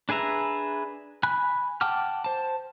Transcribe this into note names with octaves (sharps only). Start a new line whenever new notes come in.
D4 G#4 B4 E5 A#5
G#5 B5 F#6
F#5 G5 A5 D6 F6
C5 A5